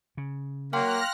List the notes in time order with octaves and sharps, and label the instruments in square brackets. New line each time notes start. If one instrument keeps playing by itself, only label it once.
[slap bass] C#3
[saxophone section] F#3 A#3 [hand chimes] F5 G5 C6 [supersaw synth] F6 F#6 A#6